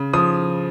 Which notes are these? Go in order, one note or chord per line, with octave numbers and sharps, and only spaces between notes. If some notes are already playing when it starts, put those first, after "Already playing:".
Already playing: C#3
F3 D#6